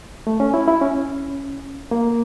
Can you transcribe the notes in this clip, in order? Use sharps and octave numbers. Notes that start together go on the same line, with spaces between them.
A3
C#4
E4
E4
C#4
A#3